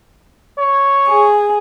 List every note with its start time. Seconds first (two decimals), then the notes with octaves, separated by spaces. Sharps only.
0.58 C#5
1.07 G#4